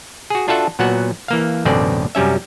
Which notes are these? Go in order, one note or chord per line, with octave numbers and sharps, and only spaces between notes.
F#4 G#4
D4 F4 F#4 A4 E5 F#5
A#2 F#3 B3 F#4 F#5
E3 A#3 F5
A1 F#2 B2 D3 C4 D5
F#2 C3 G3 C#4 E5